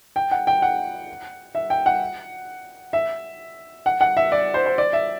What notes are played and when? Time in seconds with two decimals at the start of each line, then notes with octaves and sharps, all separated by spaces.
0.16 G5
0.31 F#5
0.47 G5
0.62 F#5
1.55 E5
1.70 G5
1.86 F#5
2.93 E5
3.86 F#5
4.01 F#5
4.17 E5
4.32 D5
4.54 C5
4.66 C5
4.78 D5
4.93 E5